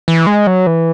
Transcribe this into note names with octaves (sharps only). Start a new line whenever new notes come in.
E3
G#3
F#3
E3